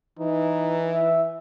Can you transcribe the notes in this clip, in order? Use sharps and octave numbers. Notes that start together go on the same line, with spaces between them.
E3 D#4
E5